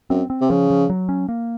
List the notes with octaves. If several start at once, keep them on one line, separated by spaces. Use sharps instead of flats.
F#2 C4
C4
C3
C#3 F3
F3
F#3
C#4
A#3